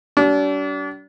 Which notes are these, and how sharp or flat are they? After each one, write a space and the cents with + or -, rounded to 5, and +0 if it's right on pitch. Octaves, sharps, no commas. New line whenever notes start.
G3 -45 D4 -35